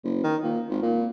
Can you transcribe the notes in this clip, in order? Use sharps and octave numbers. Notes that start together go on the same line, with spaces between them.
F#1
D#3
A#2
G#1
A#2